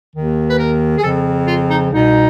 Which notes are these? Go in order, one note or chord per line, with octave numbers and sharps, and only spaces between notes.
D#2 D#3
B4
A#4
G#4
F2 C#3 F3 A4
F4
D#4
C2 B2 D#4